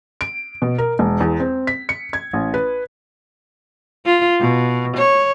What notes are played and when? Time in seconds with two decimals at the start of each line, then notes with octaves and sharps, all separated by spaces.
0.21 D7
0.62 B2
0.78 A#4
0.99 E1
1.21 E2
1.40 C4
1.67 B6
1.89 C#7
2.13 G#6
2.33 A1
2.54 B4
4.05 F4
4.40 B2
4.96 C#5